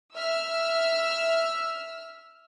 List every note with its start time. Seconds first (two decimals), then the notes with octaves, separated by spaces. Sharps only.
0.15 E5 E6 F6